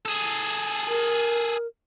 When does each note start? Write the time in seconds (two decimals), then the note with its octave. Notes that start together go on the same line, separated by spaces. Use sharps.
0.06 G#4 A4
0.88 A#4